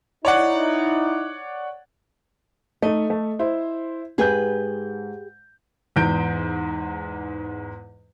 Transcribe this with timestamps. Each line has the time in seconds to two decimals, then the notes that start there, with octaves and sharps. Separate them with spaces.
0.25 D#4 E4 C#5 D5 F#5
2.82 A3 D#4 D#5
3.10 A3
3.39 E4 C5
4.18 G#2 G4 G#4 B4 G6
5.96 E2 G#2 G6 D7